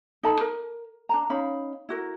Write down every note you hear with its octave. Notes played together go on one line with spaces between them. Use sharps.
D#4 A4 A5 B5
A#4
D4 A5 A#5
C#4 D#4 F5 B5
E4 F#4 A#4